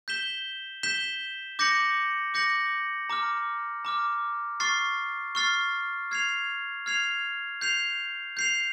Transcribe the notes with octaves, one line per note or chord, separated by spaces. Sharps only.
G6 B6 E7 G7
G6 B6 E7 G7
D6 G6 A#6 C#7 F#7
D6 G6 A#6 C#7 F#7
A#5 D6 F6
A#5 D6 F6
C#6 F6 A6 C7
C#6 F6 A6 C7
F6 G#6 C7 F7
F6 G#6 C7 F7
G6 C7 F7
G6 C7 F7